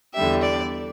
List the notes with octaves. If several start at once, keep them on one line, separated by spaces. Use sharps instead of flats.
E2 D3 G3 E5
D5